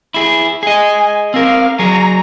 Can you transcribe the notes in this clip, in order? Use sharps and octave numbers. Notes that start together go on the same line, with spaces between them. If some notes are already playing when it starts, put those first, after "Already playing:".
E4 G#4
G#4 D#5 G#5
C4 A#4 F5
F#3 G#4 A#5